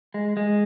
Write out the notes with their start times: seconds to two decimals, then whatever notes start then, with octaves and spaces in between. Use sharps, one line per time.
0.14 G#3
0.37 G#3